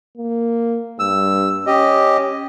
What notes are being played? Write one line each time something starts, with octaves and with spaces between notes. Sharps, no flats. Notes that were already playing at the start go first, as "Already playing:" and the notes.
A#3
G2 E6
C#4 G4 D#5